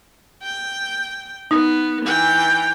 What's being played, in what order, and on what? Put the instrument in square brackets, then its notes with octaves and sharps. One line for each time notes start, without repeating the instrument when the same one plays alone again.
[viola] G5
[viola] B3 [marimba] D#4
[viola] E3 G5